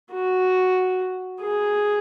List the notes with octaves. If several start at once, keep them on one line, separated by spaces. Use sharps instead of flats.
F#4
G#4